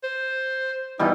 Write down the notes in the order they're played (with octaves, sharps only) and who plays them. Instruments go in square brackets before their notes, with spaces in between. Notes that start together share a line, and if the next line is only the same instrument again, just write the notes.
[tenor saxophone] C5
[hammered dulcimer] B2 E3 G3 [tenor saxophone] D#4